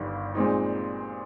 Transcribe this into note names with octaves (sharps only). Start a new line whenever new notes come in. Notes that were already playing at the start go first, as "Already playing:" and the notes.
Already playing: G1 G2 D#3 G3
A#2 G#3 C4 D#4